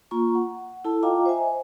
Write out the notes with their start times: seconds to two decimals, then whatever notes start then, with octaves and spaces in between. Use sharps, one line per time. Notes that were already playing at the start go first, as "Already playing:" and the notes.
0.11 A#3 F4 A#5 C#6
0.35 F#5
0.85 E4 A4 A5
1.03 F4 D#5 F5 G5 A#5 D6
1.26 C5 D#5 E5 G#5